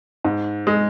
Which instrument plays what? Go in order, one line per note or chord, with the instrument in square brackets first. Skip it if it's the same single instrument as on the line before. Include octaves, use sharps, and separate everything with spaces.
[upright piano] G#2
G#3